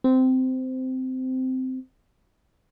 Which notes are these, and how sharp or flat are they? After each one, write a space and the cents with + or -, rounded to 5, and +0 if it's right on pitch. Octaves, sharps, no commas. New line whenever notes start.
C4 -15